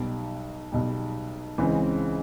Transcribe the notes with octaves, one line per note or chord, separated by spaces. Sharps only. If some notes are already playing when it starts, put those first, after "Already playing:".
Already playing: B1 B2 G3
B1 B2 G3
C#2 C#3 E3 G#3 C4